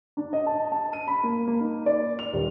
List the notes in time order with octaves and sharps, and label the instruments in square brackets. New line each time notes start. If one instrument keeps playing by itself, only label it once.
[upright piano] D4
D#5
A5
A5
D#7
B5
A#3
A#3
D#4
D5
F7
D#1